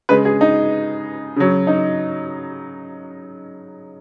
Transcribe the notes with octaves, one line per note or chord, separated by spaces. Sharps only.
C#3 G#3 B4
G#4
D#4
C#3 F#3
D#4